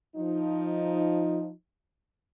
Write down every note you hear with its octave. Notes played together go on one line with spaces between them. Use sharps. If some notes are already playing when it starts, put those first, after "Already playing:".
F3 D#4